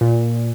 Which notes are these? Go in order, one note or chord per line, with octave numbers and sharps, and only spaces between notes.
A#2